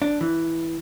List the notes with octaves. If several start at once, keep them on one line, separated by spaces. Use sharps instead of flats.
D4
E3